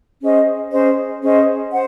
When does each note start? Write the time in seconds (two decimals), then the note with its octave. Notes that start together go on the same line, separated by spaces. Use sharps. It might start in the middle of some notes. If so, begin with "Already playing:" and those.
0.21 C#4 G#4 C5 D#5
0.71 C#4 G#4 C5 D#5
1.22 C#4 G#4 C5 D#5
1.71 C5 F#5